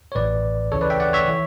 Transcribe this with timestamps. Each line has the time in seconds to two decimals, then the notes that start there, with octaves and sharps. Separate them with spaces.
0.12 C#5
0.15 A1 A2 E3 B4 D5
0.72 D2 C#3 E3 A4 C#5
0.81 B4 D5
0.90 E5 G5
1.00 D5 F#5
1.13 C#5 E5
1.28 E3